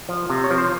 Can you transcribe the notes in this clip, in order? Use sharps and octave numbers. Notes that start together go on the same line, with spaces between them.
F3
C3
C#5
F3
C5